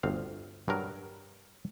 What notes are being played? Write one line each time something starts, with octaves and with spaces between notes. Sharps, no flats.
G1 D2 C4 F5
G2 F#3 A#4